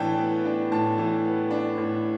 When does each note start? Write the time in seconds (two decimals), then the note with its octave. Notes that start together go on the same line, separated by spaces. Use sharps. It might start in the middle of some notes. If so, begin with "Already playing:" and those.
Already playing: A2 E3 B3 D4 G5 A5
0.18 B3
0.45 D4
0.72 A2 A5
0.98 E3
1.24 B3
1.51 D4
1.78 A2